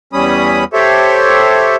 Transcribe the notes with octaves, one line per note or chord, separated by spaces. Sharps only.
E2 G3 C#4 B5 D#6
G4 A4 C5 C#5 E5